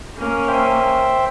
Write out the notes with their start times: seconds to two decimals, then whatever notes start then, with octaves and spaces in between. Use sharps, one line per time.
0.17 A#3 C#4
0.48 C5 E5 G5